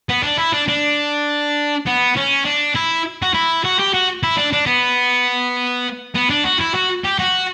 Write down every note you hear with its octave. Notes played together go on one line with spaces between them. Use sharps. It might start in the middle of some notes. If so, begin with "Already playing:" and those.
B3
D4
E4
D4
D4
B3
C#4
D4
E4
F#4
E4
F#4
G4
F#4
E4
D4
D4
B3
B3
D4
F#4
E4
F#4
G4
F#4